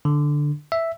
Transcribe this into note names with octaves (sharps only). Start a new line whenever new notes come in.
D3
E5